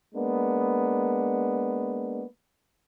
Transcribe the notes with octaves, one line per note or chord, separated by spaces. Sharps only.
G#3 A#3 B3 D4